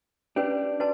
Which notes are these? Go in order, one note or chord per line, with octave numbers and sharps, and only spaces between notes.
C#4 D4 G4 B4 D5
F#4 B4 D5 A5